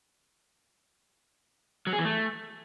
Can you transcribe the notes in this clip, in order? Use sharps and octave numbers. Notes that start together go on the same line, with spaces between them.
F#3
G#4
E3
A3